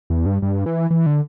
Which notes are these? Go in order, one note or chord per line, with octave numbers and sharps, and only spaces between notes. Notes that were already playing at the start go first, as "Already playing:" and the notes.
E2
G2
G2
E3
E3
D3